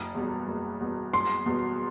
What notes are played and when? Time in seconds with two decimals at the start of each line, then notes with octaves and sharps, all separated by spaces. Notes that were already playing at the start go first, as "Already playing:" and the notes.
Already playing: F#1
0.15 E2 B2 G3
0.48 F#1
0.80 E2 B2 G3
1.13 F#1 C6
1.46 E2 B2 G3